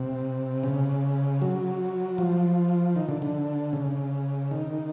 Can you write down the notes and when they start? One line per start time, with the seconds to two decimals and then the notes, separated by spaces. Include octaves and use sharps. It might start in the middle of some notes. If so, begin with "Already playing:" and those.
Already playing: C3
0.63 C#3
1.42 F#3
2.18 F3
2.96 D#3
3.09 D3
3.22 D3
3.73 C#3
4.51 D#3